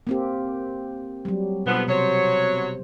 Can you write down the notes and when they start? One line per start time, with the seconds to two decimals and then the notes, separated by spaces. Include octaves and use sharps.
0.07 A#3 C4 G4
1.25 F#3 G3
1.66 B2 D3 F3 B3
1.88 C3 F#3 C5 C#5